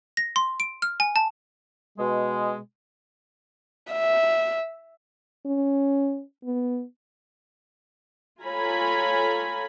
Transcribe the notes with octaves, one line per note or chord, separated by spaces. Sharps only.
A#6
C6
D7
F6
G#5
A5
B2 G#3
E5
C#4
B3
F4 A4 C#5 G#5 A#5 B5